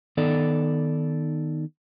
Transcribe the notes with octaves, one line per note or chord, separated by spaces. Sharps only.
D#3 B3 D#4 A4 D5